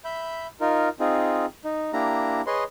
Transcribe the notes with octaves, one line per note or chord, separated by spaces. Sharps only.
E5 B5 G6
D#4 F4 A#4
C4 D#4 F4 G#4
D#4
A#3 D4 E4 G4 A#5
G#4 B4 C#5 D#5 C6